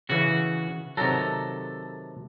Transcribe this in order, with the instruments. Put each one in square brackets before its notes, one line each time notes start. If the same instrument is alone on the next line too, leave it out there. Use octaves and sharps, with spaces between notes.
[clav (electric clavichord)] C#3 E3 [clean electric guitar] F#4
[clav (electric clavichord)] C3 D#3 F#3 [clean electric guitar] A4 A#5